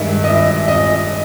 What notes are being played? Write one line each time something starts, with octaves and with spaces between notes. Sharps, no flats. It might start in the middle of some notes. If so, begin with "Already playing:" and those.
Already playing: G2 D#3 G#3 E5
D#5
E5
D#5